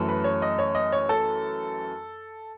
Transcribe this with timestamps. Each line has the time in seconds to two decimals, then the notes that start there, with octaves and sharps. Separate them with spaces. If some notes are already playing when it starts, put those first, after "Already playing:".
Already playing: F#2 E3 A3
0.09 B4
0.24 C#5
0.42 D#5
0.59 C#5
0.75 D#5
0.92 C#5
1.09 A4